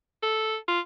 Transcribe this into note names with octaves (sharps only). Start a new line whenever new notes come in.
A4
F4